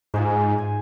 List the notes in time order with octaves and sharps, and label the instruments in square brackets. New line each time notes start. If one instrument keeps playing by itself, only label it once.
[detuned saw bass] G#2 [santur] F4 G#4 C5
[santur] G#5